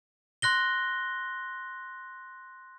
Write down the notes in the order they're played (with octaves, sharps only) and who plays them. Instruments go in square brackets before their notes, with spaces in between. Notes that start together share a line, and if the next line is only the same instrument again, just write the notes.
[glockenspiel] C6 F#6 A#6 G7